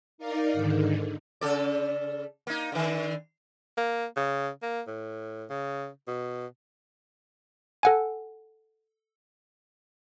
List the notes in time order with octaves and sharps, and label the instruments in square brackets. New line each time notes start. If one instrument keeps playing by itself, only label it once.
[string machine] D#4 A#4 D5 F5
G#2 D3 D#3
[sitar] C#3 A4 D5
A#3 D#4
D3 D#3
[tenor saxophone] A#3
C#3
A#3
A2
C#3
B2
[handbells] A4 F#5 G#5